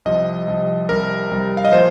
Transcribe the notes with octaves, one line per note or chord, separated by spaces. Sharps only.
C2 C3 F3 D#5
C2 C3 F3
C2 C3 G3 A#4
C2 C3 G3
F5
D#5
A#2 F3 C5